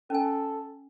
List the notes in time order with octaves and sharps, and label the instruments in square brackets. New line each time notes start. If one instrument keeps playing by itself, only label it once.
[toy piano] C#4 G#5 [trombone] A4